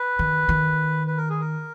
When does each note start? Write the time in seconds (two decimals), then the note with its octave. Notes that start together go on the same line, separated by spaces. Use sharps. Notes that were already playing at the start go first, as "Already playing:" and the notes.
Already playing: B4
0.19 D#3
0.49 D#3
1.07 B4
1.18 A#4
1.30 G#4
1.40 A#4